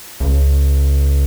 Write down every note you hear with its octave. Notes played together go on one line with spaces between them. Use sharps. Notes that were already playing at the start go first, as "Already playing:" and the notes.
C#2